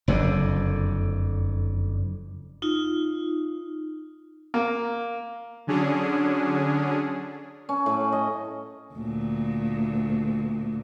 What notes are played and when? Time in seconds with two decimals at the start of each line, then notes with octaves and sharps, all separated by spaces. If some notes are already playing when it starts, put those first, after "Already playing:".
0.08 F#1 F2 D3
2.62 D#4 F4
4.54 A#3
5.67 D3 F#3 C#4 D4 G#4
7.69 C#4
7.86 A2
8.12 D#5
8.94 D2 A#2